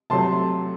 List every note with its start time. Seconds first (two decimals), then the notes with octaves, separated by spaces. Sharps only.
0.10 C3 F#3 A3 A5 C6